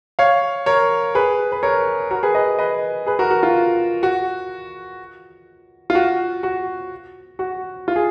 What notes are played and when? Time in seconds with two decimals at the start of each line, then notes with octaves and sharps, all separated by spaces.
0.19 C#5 F5
0.66 A#4 C#5
1.15 G#4 B4
1.52 B4
1.63 A#4 C#5
2.11 F#4 A#4
2.23 G#4 B4
2.35 B4 D#5
2.59 B4 D#5
3.06 G#4 B4
3.19 F#4 A#4
3.31 F#4
3.43 F4
4.03 F#4
5.90 F4
5.95 F#4
6.43 F#4
7.39 F#4
7.88 F4
7.96 G#4